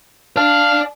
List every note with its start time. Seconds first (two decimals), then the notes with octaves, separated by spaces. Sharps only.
0.37 D5 F5 A5